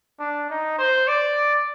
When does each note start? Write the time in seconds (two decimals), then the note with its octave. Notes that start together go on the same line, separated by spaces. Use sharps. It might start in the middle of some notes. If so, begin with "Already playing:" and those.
0.19 D4
0.49 D#4
0.78 C5
1.08 D5